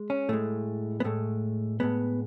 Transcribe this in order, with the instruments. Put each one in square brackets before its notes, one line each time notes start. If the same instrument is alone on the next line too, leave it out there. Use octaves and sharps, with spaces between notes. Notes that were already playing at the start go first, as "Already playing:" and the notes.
Already playing: [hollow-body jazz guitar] G#3
C#4
A2 G#3 A3
B3
A2 G#3 A3
A2 G#3 B3